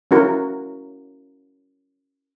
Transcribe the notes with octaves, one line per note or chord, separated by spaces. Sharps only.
C#4 E4 F#4 A#4